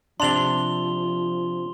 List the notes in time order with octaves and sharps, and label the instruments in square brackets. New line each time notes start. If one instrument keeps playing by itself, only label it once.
[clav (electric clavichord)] C3 D4 [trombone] F3 [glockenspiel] C6 F7 G7